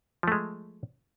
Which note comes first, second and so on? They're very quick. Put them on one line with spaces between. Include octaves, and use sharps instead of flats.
F3 A3 G#3